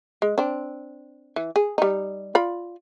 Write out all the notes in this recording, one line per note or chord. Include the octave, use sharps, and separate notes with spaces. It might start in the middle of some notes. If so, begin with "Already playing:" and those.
G#3
C4 D4
E3
G#4
G3 D#4
F4 D5 B5